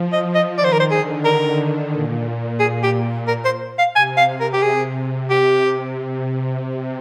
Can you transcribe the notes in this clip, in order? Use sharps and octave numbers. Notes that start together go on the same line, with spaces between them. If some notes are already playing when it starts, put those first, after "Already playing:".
Already playing: F3
D#5
D#5
D#3 D5
C5
A#4
C5
D3 G#4
A#4
A#2
G#4
G4
A#4
C5
F5
C3 G#5
F5
A#4
G4
G#4
C3 G4